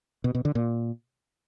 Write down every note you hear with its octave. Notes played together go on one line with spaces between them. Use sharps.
B2
B2
D3
A#2